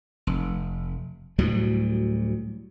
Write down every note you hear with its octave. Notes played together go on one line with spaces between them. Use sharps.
F1
D2 A2 F#3 G3